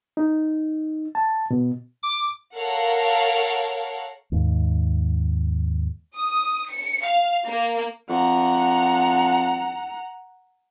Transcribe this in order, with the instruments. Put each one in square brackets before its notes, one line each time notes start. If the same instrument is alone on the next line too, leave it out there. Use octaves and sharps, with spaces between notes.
[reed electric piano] D#4
A5
B2
[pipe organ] D6
[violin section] A4 A#4 C#5 F5 F#5
[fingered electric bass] D#2 G#2
[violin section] D#6
C#7
F5
A#3
[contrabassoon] F2 [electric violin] F#5 A#5